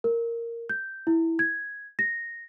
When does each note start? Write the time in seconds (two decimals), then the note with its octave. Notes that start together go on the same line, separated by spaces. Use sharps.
0.04 A#4
0.69 G6
1.07 E4
1.39 G#6
1.99 A#6